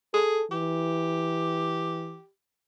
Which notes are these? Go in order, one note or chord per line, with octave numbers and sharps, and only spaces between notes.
G#4 A4
E3 G4